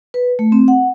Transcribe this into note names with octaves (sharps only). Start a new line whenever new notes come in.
B4
A3
C4
F#5